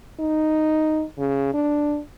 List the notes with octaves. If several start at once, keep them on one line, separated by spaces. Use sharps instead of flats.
D#4
C#3
D4